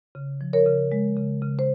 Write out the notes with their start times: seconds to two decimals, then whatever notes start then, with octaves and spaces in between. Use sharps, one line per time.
0.15 C#3
0.41 F3
0.53 A#4 C#5
0.66 C#3
0.92 G#3
1.16 C#3
1.42 C#3
1.59 C5